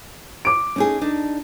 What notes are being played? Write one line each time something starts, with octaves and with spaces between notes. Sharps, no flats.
D6 D7
C#4 D#4 G#4
D4 D#4